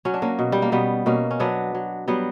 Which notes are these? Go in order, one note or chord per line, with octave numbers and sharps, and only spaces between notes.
F#3 C#4
D4
A#3 C#4
B2
G3
A#3
B2 G3 B3
B2 A#3 C#4
C#4
F#3 B3 D4
F#3
F#3 G3 B3